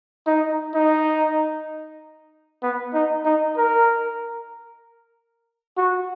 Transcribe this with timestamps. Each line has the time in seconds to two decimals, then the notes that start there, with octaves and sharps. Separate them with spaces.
0.27 D#4
0.74 D#4
2.62 B3
2.94 D#4
3.25 D#4
3.57 A#4
5.77 F#4